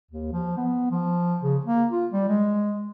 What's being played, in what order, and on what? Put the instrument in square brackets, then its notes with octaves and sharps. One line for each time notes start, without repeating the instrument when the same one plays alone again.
[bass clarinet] D#2
F3
B3
F3
C#3
A#3
F4
G3
G#3